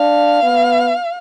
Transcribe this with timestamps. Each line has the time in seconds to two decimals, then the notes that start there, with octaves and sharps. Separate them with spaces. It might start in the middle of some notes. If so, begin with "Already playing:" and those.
Already playing: D4 F5
0.43 B3